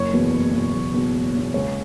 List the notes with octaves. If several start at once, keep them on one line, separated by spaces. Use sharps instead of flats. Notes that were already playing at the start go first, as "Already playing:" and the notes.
Already playing: F#1 C#5
E2 B2
F#1
E2 B2
F#1
E2 B2
F#1
E2 B2
C#2 C#5